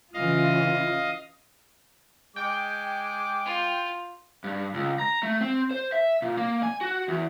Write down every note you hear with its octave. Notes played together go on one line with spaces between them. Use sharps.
C#3 E3 F4 D#5 F5
G#3 G5 D6
F4
G2
C#2
A#5
A3
C4
C5
E5
A#2
A#3
G#5
F#4
E2